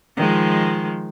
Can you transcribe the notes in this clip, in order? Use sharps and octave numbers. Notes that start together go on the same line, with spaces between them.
D#3 F3 G#3